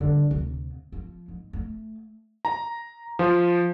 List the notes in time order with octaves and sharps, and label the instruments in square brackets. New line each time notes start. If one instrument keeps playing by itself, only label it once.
[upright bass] D3 G3
D2 C3
F3
G#2
A3
[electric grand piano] A#5
F3